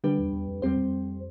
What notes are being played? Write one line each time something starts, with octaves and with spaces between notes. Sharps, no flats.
D3 G3 D4 G4 B4
E2
E2
F2
E2 G3 C4 G4 C5
F2